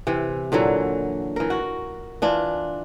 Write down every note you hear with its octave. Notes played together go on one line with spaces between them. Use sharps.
C3 E3
A#2 D3 E3 F#3
E3 A#4
F#4
E3 D4 F4